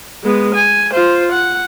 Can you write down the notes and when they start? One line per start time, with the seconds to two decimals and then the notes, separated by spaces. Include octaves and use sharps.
0.23 G#3 B3
0.55 G#5
0.93 F4 C5
1.32 F#5